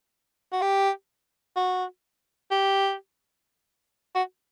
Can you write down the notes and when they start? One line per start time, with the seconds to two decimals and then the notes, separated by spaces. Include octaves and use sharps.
0.52 F#4
0.62 G4
1.56 F#4
2.51 G4
4.15 F#4